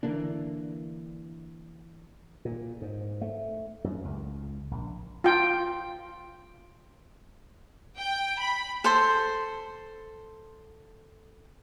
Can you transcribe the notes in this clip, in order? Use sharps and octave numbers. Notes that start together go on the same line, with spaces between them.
D3 E3 A#3 D4
A#2
G#2
A3
F#2
C#2
A#1
F4 G5
G5
B5
A4 C5 C6